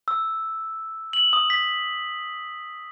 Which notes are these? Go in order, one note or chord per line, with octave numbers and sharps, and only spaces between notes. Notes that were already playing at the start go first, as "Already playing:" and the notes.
E6
F#7
D#6
B6